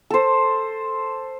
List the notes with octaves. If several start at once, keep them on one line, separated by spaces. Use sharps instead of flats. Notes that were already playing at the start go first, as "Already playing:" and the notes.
A4 C5